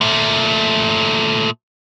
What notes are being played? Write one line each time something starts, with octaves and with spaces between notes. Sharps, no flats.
A#2 A3